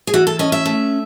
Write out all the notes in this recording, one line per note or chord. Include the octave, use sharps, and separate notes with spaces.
G#4
E3 F#4
A4
C#4 D#5
E5
A3